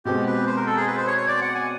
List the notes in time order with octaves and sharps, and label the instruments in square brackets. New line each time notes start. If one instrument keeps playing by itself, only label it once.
[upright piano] B2 G#3 C4 [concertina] G4
[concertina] B4
C5
A#4
A4
G#4
B4
C5
C#5
C#5
D5
F#5
G#5